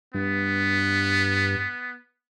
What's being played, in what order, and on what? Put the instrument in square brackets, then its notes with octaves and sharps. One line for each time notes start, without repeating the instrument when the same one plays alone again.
[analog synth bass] G2 [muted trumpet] B3